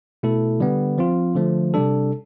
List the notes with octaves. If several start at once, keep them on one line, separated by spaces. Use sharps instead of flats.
B2 A3 E4 A4
D3 G3 B3
F3 C4 F4
D3 F3 A3
C3 G3 D4 A4